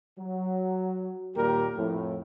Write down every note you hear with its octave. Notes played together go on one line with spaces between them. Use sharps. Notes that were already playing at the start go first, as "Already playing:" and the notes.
F#3
D#2 A#2 G3 G4 A#4
F2 A2